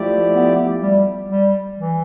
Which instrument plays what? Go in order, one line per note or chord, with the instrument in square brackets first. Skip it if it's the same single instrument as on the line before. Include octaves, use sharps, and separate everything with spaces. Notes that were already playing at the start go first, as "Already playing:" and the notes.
Already playing: [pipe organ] F3 A3 E4 G4 D5
[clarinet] B3
G3
G3
E3